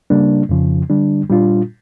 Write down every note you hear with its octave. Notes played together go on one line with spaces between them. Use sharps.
C#3 G3 A#3 D4
F2 C#3 F3
D3 G3 D4
A#2 G3 D4 F4